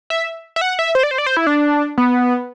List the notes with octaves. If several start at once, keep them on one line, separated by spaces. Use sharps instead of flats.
E5
E5
F#5
E5
C5
D5
C5
D5
C5
E4
D4
B3